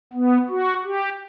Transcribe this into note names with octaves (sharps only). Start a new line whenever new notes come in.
B3
F#4
G4